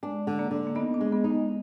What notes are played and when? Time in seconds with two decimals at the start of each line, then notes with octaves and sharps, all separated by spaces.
0.03 G#3 D4
0.27 D3
0.39 A#3
0.51 D3
0.67 A#3
0.75 B3 D#4
0.94 D4
1.01 G#3
1.12 B3
1.24 D#4
1.30 G#3